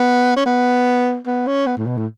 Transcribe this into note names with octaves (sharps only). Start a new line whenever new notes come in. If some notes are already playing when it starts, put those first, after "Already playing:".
Already playing: B3
C#4
B3
B3
C#4
B3
A2
B2
A2